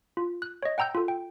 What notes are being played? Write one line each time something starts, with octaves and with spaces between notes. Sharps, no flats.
F4
F#6
C#5 D#5
F#5 G5 A#5 E6 G6
F4 A4
G5